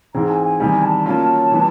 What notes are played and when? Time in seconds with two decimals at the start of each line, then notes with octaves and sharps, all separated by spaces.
0.14 G#2 E3 G#3 C4 A#5
0.30 G#5
0.44 G#5
0.60 E2 C3 D#3 G3 G#5
0.82 A5
1.05 F#3 A#3 C#4 F4 A5
1.51 E3 G3 B3